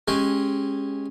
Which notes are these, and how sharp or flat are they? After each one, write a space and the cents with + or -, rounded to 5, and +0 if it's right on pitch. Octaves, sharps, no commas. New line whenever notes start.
G#3 +0 C#4 -10 G4 +10